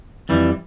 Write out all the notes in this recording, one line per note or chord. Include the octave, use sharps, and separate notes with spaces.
F2 E3 G3